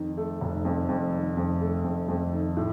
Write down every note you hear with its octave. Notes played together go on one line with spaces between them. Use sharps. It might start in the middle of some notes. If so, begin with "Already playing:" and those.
Already playing: F2 D#3
A3
F1
F2
F2
D#3
F2
A3
F2
F2
D#3
A2